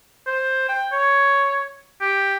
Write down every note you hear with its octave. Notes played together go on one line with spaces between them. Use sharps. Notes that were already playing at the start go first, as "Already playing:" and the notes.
C5
G5
C#5
G4